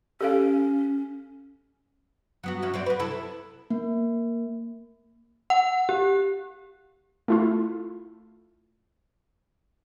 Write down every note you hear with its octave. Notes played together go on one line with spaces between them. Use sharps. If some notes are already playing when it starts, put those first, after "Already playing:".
C#4 G4 A4 F5
F#3 B3 F#4
F#3 C#4 E4
F#3 C4 D5
B3 B4
C3 E4 A4
A#3
F#5
G4
A3 E4 F4